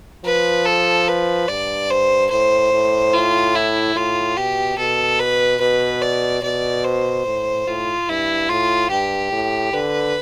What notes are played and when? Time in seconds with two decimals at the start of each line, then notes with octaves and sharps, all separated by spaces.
0.25 F3 B4
0.65 A4
1.08 B4
1.48 G2 D5
1.90 C5
2.31 A2 C5
2.73 A2
3.13 F4
3.55 E4
3.96 A2 F4
4.37 B2 G4
4.78 B2 A4
5.19 B4
5.60 B2 B4
6.02 D5
6.43 B2 D5
6.84 C5
7.26 A2
7.67 A2 F4
8.08 G2 E4
8.49 A2 F4
8.90 G2 G4
9.32 A2
9.73 D3 B4